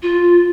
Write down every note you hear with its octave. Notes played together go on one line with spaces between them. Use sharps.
F4